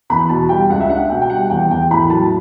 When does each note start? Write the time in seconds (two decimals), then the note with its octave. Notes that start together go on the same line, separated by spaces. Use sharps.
0.10 E2 B5
0.29 B2 A5
0.49 G3 G5
0.70 C#2 F#5
0.80 E5
0.90 D4 F#5
1.10 B2 G5
1.22 G5
1.30 G3 F#5
1.50 E2 G5
1.70 E2 G5
1.90 A2 B5
2.10 F#3 A5